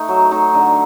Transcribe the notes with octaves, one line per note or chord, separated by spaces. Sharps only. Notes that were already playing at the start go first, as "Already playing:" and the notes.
Already playing: A3 D#4
F#3
A3 D#4
D3